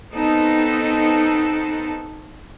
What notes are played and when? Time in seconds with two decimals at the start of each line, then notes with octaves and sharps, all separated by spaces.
0.12 B3 C4 D#4 A4